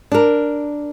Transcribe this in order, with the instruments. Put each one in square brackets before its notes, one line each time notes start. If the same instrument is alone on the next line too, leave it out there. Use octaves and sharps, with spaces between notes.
[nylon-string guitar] D4 A#4